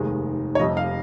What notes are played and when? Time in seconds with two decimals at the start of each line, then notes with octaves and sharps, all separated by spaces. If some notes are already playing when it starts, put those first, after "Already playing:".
Already playing: F1 D#2 D#3 G#3
0.55 C#5
0.59 F1 F2 C3 G3 D#5
0.77 F5